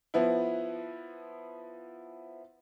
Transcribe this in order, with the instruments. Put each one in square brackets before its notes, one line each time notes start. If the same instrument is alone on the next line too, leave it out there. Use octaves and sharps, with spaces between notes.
[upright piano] F3 B3 E4